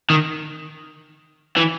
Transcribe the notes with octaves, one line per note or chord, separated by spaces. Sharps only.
D#3
E3